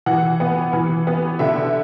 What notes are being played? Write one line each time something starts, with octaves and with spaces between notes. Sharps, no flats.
E3 F#5
B3
E3
B3
D3 E5